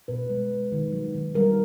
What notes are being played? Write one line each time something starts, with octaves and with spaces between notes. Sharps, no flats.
B2 B4
G#3
G#3
D#3
F#3
D#3
G3 A#4